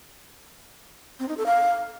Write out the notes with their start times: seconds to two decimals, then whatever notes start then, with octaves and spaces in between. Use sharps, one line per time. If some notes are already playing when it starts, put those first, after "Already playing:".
1.19 C4
1.28 D#4
1.37 A4
1.46 F5